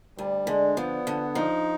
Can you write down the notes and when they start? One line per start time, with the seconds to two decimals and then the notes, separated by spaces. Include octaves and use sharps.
0.18 D2 G3
0.47 D3 G#3
0.77 F3 B3
1.07 D3
1.35 F3 D#4